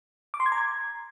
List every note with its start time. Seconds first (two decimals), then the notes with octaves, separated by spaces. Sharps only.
0.34 D6
0.40 C6
0.46 G#6
0.52 A#5
0.58 G#6